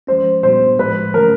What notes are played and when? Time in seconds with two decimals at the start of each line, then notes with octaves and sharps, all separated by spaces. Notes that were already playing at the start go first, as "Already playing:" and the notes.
0.07 F3 G#3 C#4 C5
0.43 A#2 G3 B3 D4 F#4 C5
0.79 A2 F3 G#3 B4
1.14 D3 F#3 A3 C#4 A#4